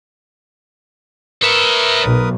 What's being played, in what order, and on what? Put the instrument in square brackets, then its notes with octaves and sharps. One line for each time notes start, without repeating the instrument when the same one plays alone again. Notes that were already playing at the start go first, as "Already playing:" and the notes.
[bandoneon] A#4 B4 D#6 [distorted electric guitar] C#5 E5
[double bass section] B1